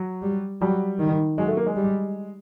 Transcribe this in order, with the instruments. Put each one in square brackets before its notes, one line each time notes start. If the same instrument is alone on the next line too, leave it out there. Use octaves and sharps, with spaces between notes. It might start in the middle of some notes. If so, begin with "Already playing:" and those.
Already playing: [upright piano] F#3
[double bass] G3
[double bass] F#3 [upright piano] G3
[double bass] D#3
[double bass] F#3 [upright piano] G#3
[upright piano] A3
A#3
G#3
[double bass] G3